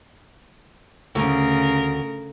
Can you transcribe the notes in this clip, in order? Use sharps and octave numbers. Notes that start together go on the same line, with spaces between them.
D2 C#3 A#4